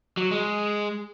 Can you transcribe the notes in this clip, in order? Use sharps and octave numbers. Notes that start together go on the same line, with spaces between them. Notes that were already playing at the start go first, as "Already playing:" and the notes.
F#3
G#3